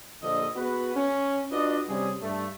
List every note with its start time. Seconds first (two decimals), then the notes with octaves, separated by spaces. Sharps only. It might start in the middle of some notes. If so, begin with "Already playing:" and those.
0.22 A#1 D3 D#5
0.56 B3 F#4 G#4 B4
0.95 C#4
1.52 D4 F4 F#4 B4 D5 D#5
1.88 C3 G3 C#4 G#4
2.22 G2 A3